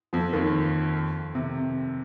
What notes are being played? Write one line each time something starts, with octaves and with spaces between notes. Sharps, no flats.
F2 F3
D#2 D#3
C3